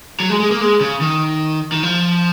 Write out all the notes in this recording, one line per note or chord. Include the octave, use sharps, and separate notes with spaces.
F#3
G#3
G#3
A#3
G#3
C#3
D#3
D#3
F3